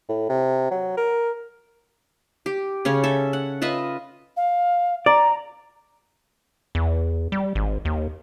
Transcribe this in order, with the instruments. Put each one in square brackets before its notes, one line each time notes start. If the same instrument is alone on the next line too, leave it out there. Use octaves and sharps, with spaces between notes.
[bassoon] A2
C3
F#3
A#4
[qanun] G4
C#3 C#4 C#5
A4 E5
F#5
F4 B4 D#5 E5
[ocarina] F5
[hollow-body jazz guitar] D5 [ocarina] A#5
[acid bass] E2
G3
G#1
D#2